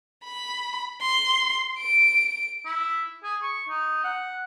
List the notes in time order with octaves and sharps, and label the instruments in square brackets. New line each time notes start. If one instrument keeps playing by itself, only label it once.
[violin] B5
C6
D7
[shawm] E4
G#4
C#6
D#4
F#5